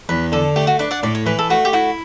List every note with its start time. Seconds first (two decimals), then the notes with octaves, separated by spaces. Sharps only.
0.09 E2 B4
0.32 D3 A4
0.56 A3 G4
0.67 F#4
0.79 D4 B4
0.91 D5 F#5
1.03 A2 D5
1.15 C#5
1.26 E3 B4
1.39 A4
1.50 A3 F#4
1.65 G4
1.73 E4 F#4